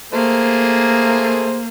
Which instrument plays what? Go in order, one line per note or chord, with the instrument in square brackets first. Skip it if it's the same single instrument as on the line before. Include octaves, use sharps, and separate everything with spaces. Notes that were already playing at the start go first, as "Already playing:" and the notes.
[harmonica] A3 G#4 C5 [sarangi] A#3